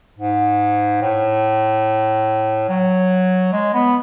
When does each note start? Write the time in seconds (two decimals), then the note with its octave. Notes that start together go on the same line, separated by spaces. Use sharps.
0.18 G#2
1.02 A2
2.69 F#3
3.52 G#3
3.74 B3